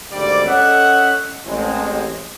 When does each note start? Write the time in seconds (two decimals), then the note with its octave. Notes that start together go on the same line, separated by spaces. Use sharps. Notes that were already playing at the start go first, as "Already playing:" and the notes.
0.12 G#1 D2 G3 C4 D5
0.46 C#4 A4 C#5 D#5 E5 F#5
1.45 A1 G#3 C4